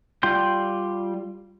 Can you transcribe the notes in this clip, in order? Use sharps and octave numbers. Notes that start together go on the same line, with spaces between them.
G3 F4 G5 C6 G6